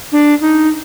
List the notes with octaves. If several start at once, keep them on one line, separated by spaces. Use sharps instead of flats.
D4
D#4